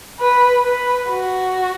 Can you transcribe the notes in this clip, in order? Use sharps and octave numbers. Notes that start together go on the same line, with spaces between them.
B4
B4
F#4